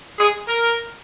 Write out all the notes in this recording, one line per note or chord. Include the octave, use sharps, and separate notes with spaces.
G#4
A#4